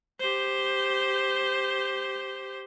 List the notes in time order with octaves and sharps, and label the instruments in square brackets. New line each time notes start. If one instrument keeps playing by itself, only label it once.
[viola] G4 C5